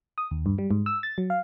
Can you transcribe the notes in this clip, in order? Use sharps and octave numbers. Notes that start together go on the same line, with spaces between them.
D#6
D#2
G2
G3
G#2
E6
A6
F#3
F5